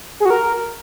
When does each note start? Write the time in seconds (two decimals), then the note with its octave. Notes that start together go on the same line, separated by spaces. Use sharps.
0.20 G#4
0.25 F#4
0.30 A#4